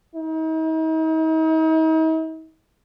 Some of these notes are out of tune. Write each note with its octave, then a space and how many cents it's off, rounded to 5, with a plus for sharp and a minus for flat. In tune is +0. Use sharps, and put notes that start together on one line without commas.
D#4 +45